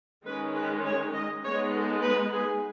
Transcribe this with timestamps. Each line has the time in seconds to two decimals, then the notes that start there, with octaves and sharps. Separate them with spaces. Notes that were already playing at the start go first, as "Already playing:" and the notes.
0.25 D#3 G#3 C#4 B4
0.55 B4
0.85 C#5
1.14 D#5
1.44 G#3 B3 D#4 C#5
1.74 A4
2.03 B4
2.32 G#4